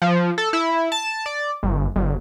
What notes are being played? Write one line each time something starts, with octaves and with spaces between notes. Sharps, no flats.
F3
A4
E4
A5
D5
G1
G1